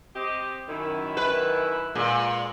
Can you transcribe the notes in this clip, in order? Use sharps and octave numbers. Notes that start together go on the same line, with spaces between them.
C4 G4 D#5
F#2 D#3 E4
B4
A#2 G#3 G#4